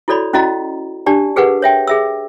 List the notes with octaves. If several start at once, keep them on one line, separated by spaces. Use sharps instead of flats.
E4 F#4 A4 C#5 D5 B5
C#4 E4 F#4 D#5 F5 A#5
D4 G4 D5 A5
G4 G#4 A#4 B4 F5 F#5
C#5 E5 G5
G#4 E5 E6